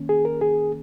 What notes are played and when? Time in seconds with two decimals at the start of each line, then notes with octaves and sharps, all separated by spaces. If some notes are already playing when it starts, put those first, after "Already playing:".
Already playing: D#3 A#3 C#4
0.09 G#4
0.25 A#4
0.41 G#4